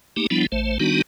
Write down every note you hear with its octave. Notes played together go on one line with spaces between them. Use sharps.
A3 A#3 D#4 G4
F3 G3 B3 D4 E4
A1 A3 C5
D#3 G3 B3 D4 D#4 F#4